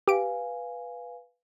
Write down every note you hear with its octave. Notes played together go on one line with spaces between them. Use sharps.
G4 B4 F5 G#5 D7